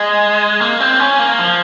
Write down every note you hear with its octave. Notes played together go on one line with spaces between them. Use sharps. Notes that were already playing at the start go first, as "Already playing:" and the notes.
Already playing: G#3
A#3
C4
C#4
A#3
F3